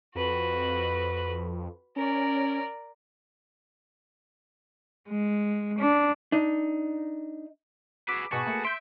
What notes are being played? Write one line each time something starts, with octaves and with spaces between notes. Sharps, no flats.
F2 F#4 B4
C#4 A#4 D5
G#3
D4
D4 D#4
F#4 G#4 B4 D6 E6 B6 D7
G#2 B2 F#4 G#4 B4 A5 C#6
A3 A#3
E5 C6 G6 D7